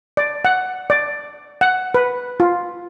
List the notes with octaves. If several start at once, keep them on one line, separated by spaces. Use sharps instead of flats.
D5
F#5
D5
F#5
B4
F4